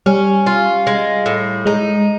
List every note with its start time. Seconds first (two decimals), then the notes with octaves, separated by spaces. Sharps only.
0.06 G3 C#4
0.46 F4
0.87 G#3
1.26 A2
1.66 G#3 D#4